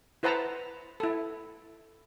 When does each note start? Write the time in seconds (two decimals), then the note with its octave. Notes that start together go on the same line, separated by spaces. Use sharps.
0.23 E4 B4 C5 F#5 A5 A#5
1.00 E4 A4